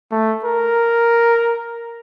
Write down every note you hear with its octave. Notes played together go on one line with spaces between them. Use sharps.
A3
A#4